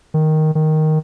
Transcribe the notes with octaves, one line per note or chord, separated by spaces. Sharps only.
D#3
D#3